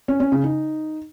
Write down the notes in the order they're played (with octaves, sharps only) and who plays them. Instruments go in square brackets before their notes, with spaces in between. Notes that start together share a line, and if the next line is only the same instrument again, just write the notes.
[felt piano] C#4
C#4
C#3
D#4